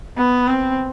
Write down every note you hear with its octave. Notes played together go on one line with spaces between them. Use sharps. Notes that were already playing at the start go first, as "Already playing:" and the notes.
B3
C4